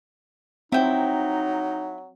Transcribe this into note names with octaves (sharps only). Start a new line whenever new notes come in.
F#3 C4 D#4 E4 G5